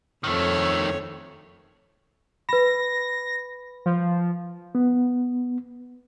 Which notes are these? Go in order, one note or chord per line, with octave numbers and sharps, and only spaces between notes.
F2 D#3 A3 C#5
B4 B5 A#6
F3
B3